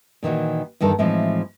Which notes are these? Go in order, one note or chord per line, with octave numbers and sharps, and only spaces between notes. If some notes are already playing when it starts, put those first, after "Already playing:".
A#2 D#3 E3 F#4
E2 G2 D#3 A4
A2 E3 F3 G#3 C4 D#4